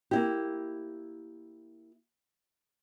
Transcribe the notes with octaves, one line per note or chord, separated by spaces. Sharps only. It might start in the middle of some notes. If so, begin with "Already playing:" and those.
A#3 E4 G4